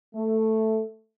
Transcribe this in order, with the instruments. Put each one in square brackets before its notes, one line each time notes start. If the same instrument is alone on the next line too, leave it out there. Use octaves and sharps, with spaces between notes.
[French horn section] A3